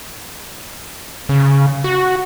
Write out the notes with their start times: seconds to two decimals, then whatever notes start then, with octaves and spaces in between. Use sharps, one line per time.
1.29 C#3
1.84 F#4